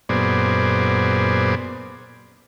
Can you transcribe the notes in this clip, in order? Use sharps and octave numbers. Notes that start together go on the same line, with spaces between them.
F#2 A#2 B3 G#4 C5 D5